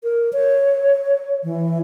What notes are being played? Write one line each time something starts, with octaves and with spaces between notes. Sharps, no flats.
A#4
C#5
E3